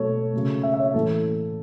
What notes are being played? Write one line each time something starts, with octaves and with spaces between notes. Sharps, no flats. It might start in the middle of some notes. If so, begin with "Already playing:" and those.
Already playing: B2 F#3 A3 A4 C#5
C#3 F#3 A3
E5
E5
C#5
A2 E3 A3 A4